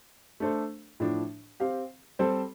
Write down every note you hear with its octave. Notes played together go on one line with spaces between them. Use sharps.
A3 D4 A4 C5
A2 F3 D4
C4 G4 F5
G3 C4 A4 C5